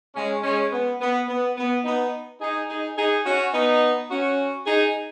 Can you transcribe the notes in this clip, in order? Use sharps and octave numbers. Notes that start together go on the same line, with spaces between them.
G#3 C#4
G#3 C#4
B3
B3
B3
B3
B3 D#4
D#4 G#4
D#4 G#4
D#4 G#4
C#4 F#4
B3 D#4
C#4 F#4
D#4 G#4